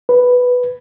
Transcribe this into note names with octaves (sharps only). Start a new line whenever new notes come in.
B4